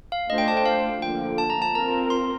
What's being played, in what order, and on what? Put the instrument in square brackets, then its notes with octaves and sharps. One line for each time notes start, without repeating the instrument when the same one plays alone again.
[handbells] F5
[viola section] A3 D4 F4 C5 [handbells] D#5
[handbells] G5
A5
G5
F5
[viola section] D3 F3 A#3 [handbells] G5
[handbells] A5
A#5
A5
[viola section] C4 F4 A#4 [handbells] A#5
[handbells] C6